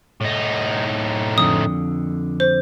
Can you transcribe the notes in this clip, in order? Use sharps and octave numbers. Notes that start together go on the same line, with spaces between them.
A2 D#4
F2 D3 D#6
C5